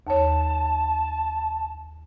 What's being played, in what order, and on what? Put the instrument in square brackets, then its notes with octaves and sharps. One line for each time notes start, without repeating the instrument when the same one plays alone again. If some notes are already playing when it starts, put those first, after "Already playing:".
[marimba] D#2 C#5 [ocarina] A5